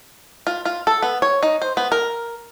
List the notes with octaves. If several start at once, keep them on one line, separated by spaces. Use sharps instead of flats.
F4
F4
A4
B3
C#5
D#4
C5
B3
A#4